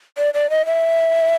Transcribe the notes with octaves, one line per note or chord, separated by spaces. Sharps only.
D5
D5
D#5
E5